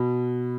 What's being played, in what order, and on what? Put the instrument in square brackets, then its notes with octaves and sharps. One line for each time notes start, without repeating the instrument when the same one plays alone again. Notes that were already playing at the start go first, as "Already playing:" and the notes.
Already playing: [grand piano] B2